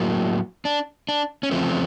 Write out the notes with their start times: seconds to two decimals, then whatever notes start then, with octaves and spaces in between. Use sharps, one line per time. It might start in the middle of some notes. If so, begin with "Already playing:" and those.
Already playing: A2 F#3 A#3
0.65 D4
1.09 D4
1.43 C#4
1.51 E2 C#3 F3 A3 C4